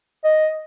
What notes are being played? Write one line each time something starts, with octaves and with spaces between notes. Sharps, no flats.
D#5